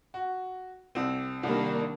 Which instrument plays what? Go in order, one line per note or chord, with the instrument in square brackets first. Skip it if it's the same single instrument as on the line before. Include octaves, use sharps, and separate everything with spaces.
[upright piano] F#4
C2 C4
[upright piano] C2 G3 [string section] D#3 A#3 D4